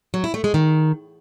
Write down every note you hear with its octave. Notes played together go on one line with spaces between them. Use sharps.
F#3
E4
A3
G#3
D#3